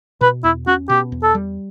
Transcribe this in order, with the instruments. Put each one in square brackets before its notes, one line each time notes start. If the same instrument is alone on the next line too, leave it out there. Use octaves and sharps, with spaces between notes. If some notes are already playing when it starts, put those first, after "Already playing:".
[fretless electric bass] B2 [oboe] B4
[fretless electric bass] E2 [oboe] E4
[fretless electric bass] C#4 [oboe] F#4
[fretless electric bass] B2 [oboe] G4
[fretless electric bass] E2
[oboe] A4
[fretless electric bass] G3